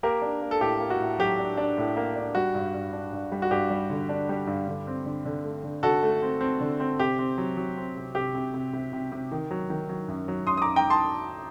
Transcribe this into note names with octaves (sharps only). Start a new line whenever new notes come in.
A#3 G4 A#4
D4
A#3
A4
A2 G4
A#3
F#4
A2
F#3 G4
D4
D4
A2
A#3
D4
G3 F#4
G2
G2
D4
G2
G3
F#4
G2 G4
G3
D3
D4
G3
G2
D3
C4
D3
D3
A3
D3
D3 F#4 A4
A3
C4
C4
D3
C4
C3 G4
C4
F#3
F#3
C4
C3
C3 G4
C3
C3
C3
C3
C3
D#3
F#3
D#3
F#3
F#2
F#3
F#2 C6 D#6
D#6
F#2 A#5 D6
G5 A#5
A5 C6